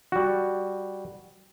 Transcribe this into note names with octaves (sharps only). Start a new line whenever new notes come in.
G3 F#4